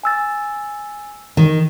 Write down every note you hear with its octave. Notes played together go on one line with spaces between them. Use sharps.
G#5 E6 A6
D#3